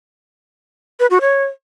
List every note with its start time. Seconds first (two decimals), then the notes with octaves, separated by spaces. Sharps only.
1.00 B4
1.10 F#4
1.21 C#5